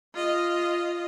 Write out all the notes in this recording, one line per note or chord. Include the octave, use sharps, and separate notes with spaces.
F4 D#5